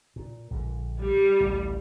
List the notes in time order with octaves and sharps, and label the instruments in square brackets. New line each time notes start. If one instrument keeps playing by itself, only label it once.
[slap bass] A#2
A#1 D3
[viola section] G3
[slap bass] A1 D2